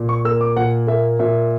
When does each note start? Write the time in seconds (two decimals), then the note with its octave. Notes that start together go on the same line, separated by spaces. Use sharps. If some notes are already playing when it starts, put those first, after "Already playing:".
Already playing: A#2
0.09 C#6
0.25 A#3 E6
0.41 D6
0.56 A#2 F#5
0.87 A#3 E5
1.19 A#2 E5